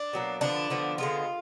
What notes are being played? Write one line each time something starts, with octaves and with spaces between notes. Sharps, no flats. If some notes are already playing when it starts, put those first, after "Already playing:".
Already playing: D4
B2 F#3 A#3
D3 F3 B3 D4
D3 F3 B3
D3 G#3 B3 F4